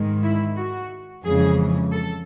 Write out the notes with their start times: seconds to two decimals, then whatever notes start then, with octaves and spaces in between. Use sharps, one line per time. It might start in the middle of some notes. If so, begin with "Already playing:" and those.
Already playing: G#2 D#3 G#3
0.24 E4
0.57 F#4
1.24 F2 C#3 E3 G#3 G#4
1.92 A4